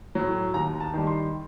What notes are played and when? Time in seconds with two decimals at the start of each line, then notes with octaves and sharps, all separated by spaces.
0.15 A2 F#3
0.54 D#2 A#5
0.80 A5
0.93 D#3 G3
1.07 C6